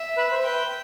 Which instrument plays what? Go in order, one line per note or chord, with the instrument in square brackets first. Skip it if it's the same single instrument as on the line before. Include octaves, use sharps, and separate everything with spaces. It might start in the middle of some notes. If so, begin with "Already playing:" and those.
Already playing: [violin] E5
[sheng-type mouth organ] B4
C5
[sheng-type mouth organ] B4 [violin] G5